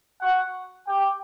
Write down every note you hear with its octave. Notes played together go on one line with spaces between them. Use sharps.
F#4 F#5
G4 G5